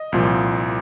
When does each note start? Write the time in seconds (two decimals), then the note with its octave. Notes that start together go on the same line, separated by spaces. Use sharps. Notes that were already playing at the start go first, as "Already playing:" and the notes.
Already playing: D#5
0.12 C2 A#2 F3